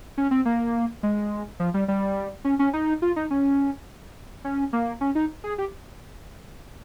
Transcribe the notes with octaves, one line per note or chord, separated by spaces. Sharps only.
C#4
C4
A#3
G#3
F3
G3
G3
C#4
C#4
D#4
F4
D#4
C#4
C#4
A#3
C#4
D#4
G#4
G4